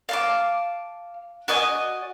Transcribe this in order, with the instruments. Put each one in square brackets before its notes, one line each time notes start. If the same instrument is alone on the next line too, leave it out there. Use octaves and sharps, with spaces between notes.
[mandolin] F5 A5 D6
F#4 D5 D#5 G#5